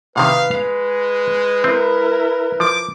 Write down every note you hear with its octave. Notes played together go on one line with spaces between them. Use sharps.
A2 C3 D#3 B4 F5
G#3 F5
C4 E4 A#4
F3 D6